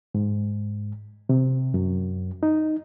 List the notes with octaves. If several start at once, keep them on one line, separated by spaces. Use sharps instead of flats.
G#2
C3
F#2
D#4